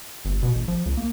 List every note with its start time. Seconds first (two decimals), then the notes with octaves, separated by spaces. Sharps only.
0.25 G1
0.43 B2
0.55 A1
0.68 F3
0.86 C#2
0.97 A#3